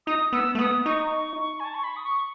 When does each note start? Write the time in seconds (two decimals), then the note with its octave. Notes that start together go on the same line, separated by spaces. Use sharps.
0.07 D#4 D#6
0.33 B3 E6
0.55 A3
0.59 B3 D#6
0.85 D#4 C#6
1.12 C#6
1.38 C#6
1.60 G#5
1.65 A5
1.74 C#6
1.84 B5
1.96 D#6
2.04 C#6